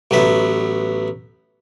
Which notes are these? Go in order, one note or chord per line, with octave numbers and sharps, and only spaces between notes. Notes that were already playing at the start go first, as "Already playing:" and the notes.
A1 F#3 B3 E5